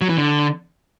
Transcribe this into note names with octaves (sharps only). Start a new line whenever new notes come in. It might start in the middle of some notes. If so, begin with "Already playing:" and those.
F#3
E3
D3